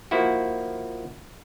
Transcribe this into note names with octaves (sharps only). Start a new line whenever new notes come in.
F3 A#3 E4 F#4